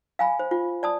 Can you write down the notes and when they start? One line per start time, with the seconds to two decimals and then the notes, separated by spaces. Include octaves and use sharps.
0.19 F5 G#5 B5
0.39 C5
0.51 F4
0.83 D5 A5 D#6